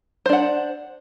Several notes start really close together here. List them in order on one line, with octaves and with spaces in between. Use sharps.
C5 D4 F#5